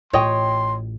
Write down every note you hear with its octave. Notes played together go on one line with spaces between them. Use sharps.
A1 F4 C#5 D#5 G5 C6